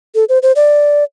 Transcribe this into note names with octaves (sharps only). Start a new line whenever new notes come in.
A4
C5
C5
D5